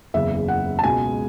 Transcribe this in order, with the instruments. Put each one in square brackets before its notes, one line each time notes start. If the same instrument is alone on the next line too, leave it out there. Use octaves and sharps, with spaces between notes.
[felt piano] F#1 E2 C#3 E5
F#5
A5
C#2 B2 G#3 G#5